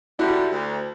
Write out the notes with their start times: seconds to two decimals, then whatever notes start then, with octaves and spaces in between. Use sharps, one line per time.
0.19 D3 G3 E4 F#4
0.51 D2